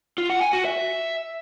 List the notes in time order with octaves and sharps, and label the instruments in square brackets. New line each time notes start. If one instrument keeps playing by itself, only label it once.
[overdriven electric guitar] F4
F#5
G#5
F#4
E5